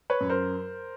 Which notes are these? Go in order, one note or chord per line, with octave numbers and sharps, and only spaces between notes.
B4 C#5
F#2
A#4 C5